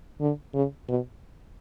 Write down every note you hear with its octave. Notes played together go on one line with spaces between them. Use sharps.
D3
C#3
B2